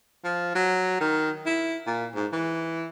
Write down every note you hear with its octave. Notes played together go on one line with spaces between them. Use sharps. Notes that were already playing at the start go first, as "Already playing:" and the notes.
F3
F#3
D#3
E4
A#2
G#2
E3